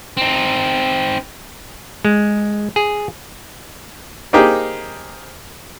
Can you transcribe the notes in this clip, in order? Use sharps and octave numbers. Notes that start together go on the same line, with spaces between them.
C4 D#4
G#3
G#4
A#3 C4 D#4 G4 G#4